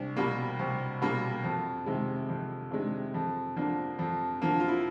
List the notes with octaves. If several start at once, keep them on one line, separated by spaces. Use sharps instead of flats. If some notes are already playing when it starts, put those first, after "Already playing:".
Already playing: C2 D4
B2 G3 A#3
C2
B2 G3 A#3
F2
C3 D#3 G#3
F2
C3 D#3 G#3 D4
F2
D3 F3 A#3 D4
F2
D3 F3 A#3
F4
E4